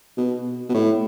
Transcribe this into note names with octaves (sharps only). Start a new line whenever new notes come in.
B2
B2
A2